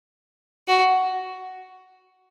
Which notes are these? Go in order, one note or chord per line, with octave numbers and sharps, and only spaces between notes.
F#4